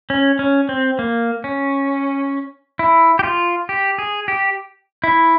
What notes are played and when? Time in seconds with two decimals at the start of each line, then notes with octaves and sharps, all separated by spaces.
0.10 C#4
0.39 C#4
0.69 C4
0.99 A#3
1.44 C#4
2.79 E4
3.19 G4
3.23 F4
3.69 G4
3.98 G#4
4.28 G4
5.04 E4